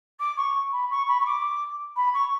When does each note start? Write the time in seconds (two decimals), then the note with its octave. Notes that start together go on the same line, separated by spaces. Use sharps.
0.19 D6
0.37 C#6
0.72 B5
0.90 C#6
1.08 B5
1.20 C#6
1.26 D6
1.96 B5
2.14 C#6